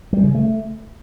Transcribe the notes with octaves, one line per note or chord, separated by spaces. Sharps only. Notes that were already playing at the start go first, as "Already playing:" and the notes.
G3
C#3
A3